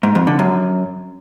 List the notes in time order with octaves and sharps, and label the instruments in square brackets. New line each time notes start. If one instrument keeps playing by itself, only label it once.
[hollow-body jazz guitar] G#2
F2
D3
F#2